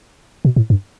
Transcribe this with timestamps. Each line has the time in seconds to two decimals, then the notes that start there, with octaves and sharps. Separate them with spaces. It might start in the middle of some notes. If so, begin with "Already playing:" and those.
0.45 B2
0.56 A2
0.70 G2